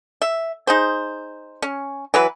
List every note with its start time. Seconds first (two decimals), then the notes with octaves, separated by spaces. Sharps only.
0.22 E5
0.67 D#4 G#4 C5
1.62 C#4
2.14 E3 F#3 B4